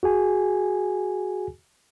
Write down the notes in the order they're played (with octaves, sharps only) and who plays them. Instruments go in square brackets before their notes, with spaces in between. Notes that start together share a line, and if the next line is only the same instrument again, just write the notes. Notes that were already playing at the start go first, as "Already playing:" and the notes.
[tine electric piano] F#4 G#4 G#5